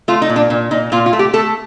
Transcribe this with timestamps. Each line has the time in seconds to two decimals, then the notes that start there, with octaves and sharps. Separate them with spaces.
0.08 A3 F4
0.22 D#4
0.30 A#2
0.36 D4
0.50 A#2
0.71 A#2 D#4
0.92 A#2 F4
1.06 F4
1.13 A3
1.19 G4
1.33 A3 A4